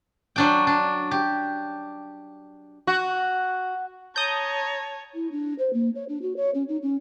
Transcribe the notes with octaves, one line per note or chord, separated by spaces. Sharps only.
F#3 D4 G5
D4
G4
F#4
C#5 A5 A#5 D#6 G6
E4
D4
C5
A#3
C#5
D4
F#4
C#5
C#4
D#4
C#4